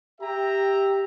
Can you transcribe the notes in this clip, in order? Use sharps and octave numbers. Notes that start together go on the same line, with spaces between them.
G4 E5 G5 A#5